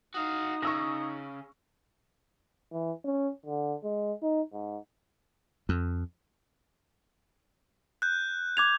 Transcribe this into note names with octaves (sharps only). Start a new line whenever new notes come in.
D#4 F#4 F5 D#6
C#3 C#6 E6 A#6
E3
C#4
D3
G#3
D#4
G#2
F2
F#6 G6
D6 G#6 F7